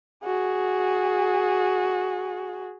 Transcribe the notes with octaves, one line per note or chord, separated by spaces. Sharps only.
F#4 G#4